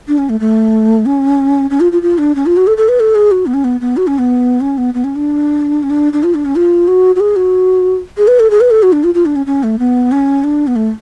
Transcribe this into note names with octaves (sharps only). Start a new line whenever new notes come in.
D4
C#4
A3
A3
C#4
C#4
F4
F4
F4
D4
C#4
F4
F#4
A4
A4
B4
A4
G#4
F#4
B3
C#4
B3
B3
F#4
C#4
B3
C#4
B3
B3
C#4
D4
C#4
D4
D4
F4
D4
C#4
F4
F#4
F#4
G#4
F#4
G#4
B4
A4
G#4
B4
A4
F#4
D4
F4
F4
D4
C#4
C#4
A3
B3
C#4
D4
B3
A3